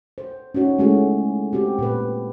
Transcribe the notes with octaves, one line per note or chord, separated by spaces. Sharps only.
C5
C#4 D#4 F#4 C#5
G#3 A3 C#4 E4 F#4 G#4
C4 F#4 G4
A#2 B4